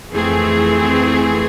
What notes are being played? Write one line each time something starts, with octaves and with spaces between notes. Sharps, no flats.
F2 E3 A3 C4 G#4